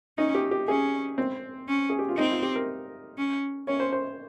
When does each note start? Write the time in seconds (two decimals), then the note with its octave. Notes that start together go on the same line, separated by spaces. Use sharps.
0.18 C#4 D#4
0.35 G4
0.51 G4
0.68 C#4 G#4
1.18 C4
1.68 C#4
1.90 G#4
1.99 G4
2.09 F4
2.17 C4 D#4
2.30 F4
2.43 G4
2.55 A#4
3.18 C#4
3.67 C#4 C#5
3.80 C5
3.93 C5